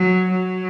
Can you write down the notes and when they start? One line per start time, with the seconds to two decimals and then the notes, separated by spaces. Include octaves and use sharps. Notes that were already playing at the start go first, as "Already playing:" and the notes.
Already playing: F#3
0.32 F#3